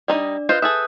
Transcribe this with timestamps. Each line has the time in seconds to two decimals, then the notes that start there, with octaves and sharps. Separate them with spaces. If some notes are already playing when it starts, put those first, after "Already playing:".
0.08 G3 D4 D#4 D5 D#5
0.49 F4 B4 C5 D#5 F#6 G6
0.62 G#4 A4 E5 D#6 F#6